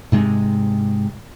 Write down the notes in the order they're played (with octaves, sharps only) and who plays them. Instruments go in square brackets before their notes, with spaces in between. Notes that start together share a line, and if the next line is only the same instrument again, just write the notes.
[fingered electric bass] G#2 C3 G#3